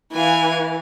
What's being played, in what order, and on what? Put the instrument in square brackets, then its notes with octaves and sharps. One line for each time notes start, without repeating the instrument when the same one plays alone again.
[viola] E3 [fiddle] F5 G#5